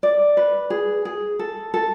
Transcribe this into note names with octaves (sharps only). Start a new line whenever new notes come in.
D5
B4
G#4
G#4
A4
A4